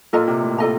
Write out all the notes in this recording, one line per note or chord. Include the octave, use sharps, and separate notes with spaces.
A#2 F4 A4 D#5 A#5
C3
A2
F4 A4 D#5 A#5